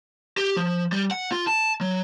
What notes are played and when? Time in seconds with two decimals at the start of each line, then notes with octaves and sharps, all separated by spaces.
0.37 G4
0.57 F3
0.92 G3
1.11 F#5
1.32 F4
1.47 A5
1.81 F#3